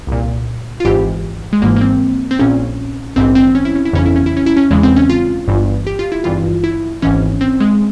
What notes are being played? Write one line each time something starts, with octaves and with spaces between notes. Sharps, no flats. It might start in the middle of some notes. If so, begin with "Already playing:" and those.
C2 A#2
F4
G#1 G#2 E3 G4
G#3
G#1 G#2 E3 A#3
A#3
C4
C4
A#1 A#2 C#4
A#1 G#2 E3 C4
C4
C#4
E4
C#4
E4
G1 F2 C#3 E3 C#4
E4
C#4
E4
C#4
E4
C#4
E2 C#3 E3 G#3
C4
C#4
F4
G1 G2 E3
G4
F4
E4
G#1 G2 E3 F4
E4
G#1 G#2 E3 C#4
C4
G#3